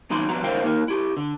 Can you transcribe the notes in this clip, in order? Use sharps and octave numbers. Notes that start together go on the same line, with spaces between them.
D#2 F#3 D#4 B5 C6
F3 B3 F#4 A#5
D3 E4 A#4 C5 F5 G5
A#3 D#4 A#4
E4 G4
D3